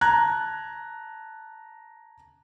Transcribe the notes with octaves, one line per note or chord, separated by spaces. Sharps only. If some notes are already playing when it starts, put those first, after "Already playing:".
A5 A#5 F#6 G#6